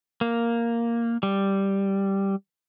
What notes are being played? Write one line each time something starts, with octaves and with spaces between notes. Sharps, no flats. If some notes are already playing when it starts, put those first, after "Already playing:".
A#3
G3